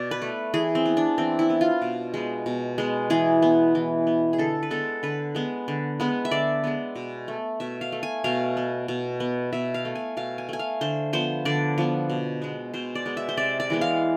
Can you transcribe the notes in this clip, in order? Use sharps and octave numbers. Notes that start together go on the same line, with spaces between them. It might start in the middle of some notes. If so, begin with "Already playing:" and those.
Already playing: B2 D5
B4
A3
E3 G#4
C4
B3
D4
E3 C4
E4
B3
F4
B2
G#3 B3
B2
G#3 B3
E3 G#4
B3
E3
B3
G#4
D3 A4
B4
G#3 B3 A4
D3 B4
G#3 B3
D3
G#3 B3
E5
D3 D5
G#3 B3
B2
A3
B2 E5
F5
A3
G#5
B2 F5
B3
B2
B3
B2 E5
F5
A3
G#5
B2 F5
G#5
A3 G#5
F5
D3 C5
F3 B3 C5
D3 D5
F3 B3
B2
G#3 B3
B2 C5
D5
G#3 B3
E5
C5
C3 D5
D5
E3 G#3 B3
F5